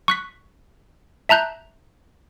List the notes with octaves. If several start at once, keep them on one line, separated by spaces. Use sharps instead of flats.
C#6 F#6 B6
E5 A5 A#5 F#6 G6